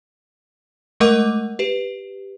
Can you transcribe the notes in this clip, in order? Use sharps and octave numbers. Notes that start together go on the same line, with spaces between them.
G#3 A3 A#4 D#5 F#5 D6
G4 B4